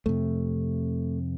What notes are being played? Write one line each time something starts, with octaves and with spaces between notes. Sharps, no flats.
F2 C3 A3